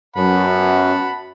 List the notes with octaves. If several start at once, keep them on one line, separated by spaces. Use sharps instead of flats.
F#2 F#5 A5 B5